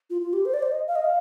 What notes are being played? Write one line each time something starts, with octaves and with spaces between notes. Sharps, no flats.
F4
F4
G4
C5
D5
C5
D#5
F5
D#5
F5